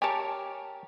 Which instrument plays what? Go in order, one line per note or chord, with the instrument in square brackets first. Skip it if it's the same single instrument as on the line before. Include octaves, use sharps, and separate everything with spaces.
[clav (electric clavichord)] G4 A#4 C#5 [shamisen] G#5 A5